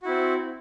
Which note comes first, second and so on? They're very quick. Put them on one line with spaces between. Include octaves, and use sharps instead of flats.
F#4 E4 C4